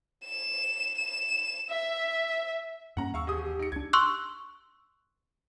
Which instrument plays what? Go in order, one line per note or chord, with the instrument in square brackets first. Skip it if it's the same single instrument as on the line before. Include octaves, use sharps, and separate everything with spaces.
[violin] E7
E7
E5
[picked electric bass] G2 A#3 C#4 [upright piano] F#5 A#5
[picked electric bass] D#2 [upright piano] F5 C#6 E6
[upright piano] E1 G#4 D#6 [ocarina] G4
[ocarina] G4
[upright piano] D#4 C#7
[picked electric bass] C#2 D4 [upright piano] G#6
[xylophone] C6 C#6 E6 F#6